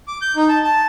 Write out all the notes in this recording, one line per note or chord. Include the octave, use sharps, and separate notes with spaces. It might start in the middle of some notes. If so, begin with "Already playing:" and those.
D6
G6
D#4
A5
A5